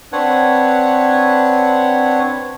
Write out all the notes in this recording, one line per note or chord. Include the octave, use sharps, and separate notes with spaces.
C4 D4 B4 C#5 F#5